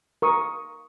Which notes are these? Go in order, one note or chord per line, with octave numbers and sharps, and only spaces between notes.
A#4 C#6 D#6